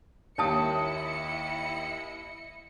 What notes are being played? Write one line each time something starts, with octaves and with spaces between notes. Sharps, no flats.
D#2 E4 C#5 D#5 A5 D#6 C#7